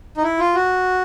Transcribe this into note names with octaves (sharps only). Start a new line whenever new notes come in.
D#4
E4
F4
F#4